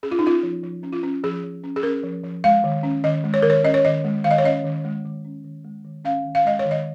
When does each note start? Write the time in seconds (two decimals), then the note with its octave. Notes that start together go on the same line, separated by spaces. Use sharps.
0.03 C#4 G#4
0.11 F4
0.19 D#4
0.23 C#4 F4
0.43 F3
0.63 F3
0.83 C#4
0.92 F4
1.03 C#4
1.24 F3 G#4
1.43 F3
1.63 C#4
1.76 G#4
1.83 C#4 A#4
2.03 F3
2.23 F3
2.44 G#3 F5
2.64 D#3
2.83 C#4
3.04 D#3 D#5
3.24 G#3
3.34 C#5
3.42 D#3 A#4
3.50 C#5
3.64 C#4 D#5
3.74 C#5
3.85 D#3 D#5
4.04 G#3
4.24 D#3 F5
4.31 D#5
4.38 C#5
4.44 C#4 D#5
4.64 D#3
4.85 G#3
5.05 D#3
5.25 C#4
5.44 D#3
5.65 G#3
5.85 D#3
6.05 C#4 F5
6.24 D#3
6.35 F5
6.45 G#3 D#5
6.59 C#5
6.65 D#3
6.71 D#5